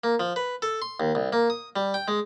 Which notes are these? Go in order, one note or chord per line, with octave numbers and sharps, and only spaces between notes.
A#3
F3
B4
A4
C6
D#2
C2
A#3
D#6
G3
G5
G#3